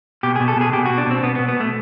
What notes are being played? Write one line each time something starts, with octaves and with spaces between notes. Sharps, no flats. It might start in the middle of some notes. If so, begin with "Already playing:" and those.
B2 G4
B2 G#4
A4
B2 G#4
B2 G4
B2 F#4
D4
B2 C4
B2 B3
B2 B3
B3
B2 A3